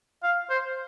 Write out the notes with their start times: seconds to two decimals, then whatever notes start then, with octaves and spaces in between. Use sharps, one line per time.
0.23 F5
0.50 C5